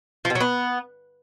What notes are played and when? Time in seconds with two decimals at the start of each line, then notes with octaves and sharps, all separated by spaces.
0.25 F3
0.30 B2
0.35 F#3
0.41 B3